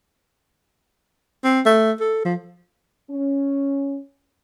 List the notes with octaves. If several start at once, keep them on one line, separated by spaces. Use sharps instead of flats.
C4
A3
A4
F3
C#4